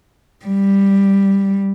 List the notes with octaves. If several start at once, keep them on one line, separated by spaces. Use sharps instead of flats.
G3